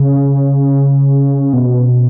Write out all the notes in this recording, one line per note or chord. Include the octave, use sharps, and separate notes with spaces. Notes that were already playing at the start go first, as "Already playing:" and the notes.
Already playing: C#3
B2